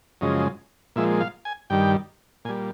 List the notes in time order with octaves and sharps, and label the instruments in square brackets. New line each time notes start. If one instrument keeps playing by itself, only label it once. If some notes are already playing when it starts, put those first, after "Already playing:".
[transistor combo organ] F#2 C#3 F3 G#3 D#5
A#2 F3 G#3 E5
F5
G#5
G2 D#3 G3 G5
A#2 G#5
G3